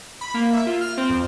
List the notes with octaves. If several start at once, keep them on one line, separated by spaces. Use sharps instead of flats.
B5
A#3
E5
F4
F6
C4
F2